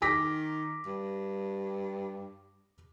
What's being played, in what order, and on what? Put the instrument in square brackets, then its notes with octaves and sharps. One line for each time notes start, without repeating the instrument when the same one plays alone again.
[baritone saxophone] D#3 [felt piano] D6 A#6 B6
[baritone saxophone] G2